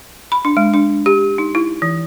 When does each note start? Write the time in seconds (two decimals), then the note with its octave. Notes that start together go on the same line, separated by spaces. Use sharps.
0.32 B5
0.45 D4
0.57 G#3
0.74 D4
1.06 G4
1.38 D#4
1.55 E4
1.82 E3